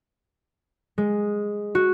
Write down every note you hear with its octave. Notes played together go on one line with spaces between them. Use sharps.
G#3
F#4